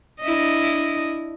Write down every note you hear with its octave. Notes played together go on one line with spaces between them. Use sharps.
D4 E4 D#5